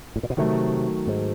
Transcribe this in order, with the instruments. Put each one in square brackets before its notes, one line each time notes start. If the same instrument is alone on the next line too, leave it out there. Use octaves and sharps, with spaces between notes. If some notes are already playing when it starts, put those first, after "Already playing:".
[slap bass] A2
A#2
B2
[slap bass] C3 [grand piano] D#3 F#3 A3
[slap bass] G#2